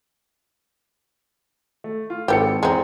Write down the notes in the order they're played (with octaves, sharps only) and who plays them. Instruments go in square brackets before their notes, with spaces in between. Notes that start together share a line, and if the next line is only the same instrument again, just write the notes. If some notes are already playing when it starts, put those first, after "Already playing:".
[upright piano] A3
F4
[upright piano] G#1 A4 C#7 [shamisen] E3 G4
[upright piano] E2 A#5 [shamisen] G#3 C4